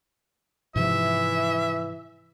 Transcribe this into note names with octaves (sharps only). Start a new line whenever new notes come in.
G#2 C3 E3 F3 E5